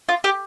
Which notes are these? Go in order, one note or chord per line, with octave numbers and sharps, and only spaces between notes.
F4
G4